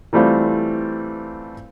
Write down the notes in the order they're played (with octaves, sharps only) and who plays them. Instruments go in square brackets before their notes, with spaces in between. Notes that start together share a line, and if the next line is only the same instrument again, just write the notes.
[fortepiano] E3 G3 A3 C4 F4